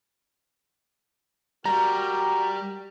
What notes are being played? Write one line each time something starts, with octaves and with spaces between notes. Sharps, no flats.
G3 F#4 A#4 G5 A#5